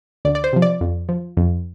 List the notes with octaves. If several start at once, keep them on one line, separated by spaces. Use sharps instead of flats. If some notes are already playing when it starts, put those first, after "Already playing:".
D2 D5
D5
C5
C3 F3
D5
F2
F3
F2